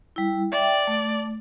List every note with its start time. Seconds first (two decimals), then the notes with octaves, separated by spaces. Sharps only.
0.16 G3 E4
0.52 D5 E5 G5
0.87 A3